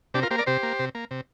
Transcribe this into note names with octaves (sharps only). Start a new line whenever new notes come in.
C3 D4 G4
F4 A#4
A#3 G4 C5
A#4 D5
C3 G4 C5
A#3
C3
A#3
C3